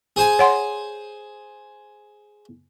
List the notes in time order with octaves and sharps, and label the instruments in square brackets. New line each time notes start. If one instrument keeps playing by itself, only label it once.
[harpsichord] G#4 C5 G#5
[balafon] C#5 F#5 C6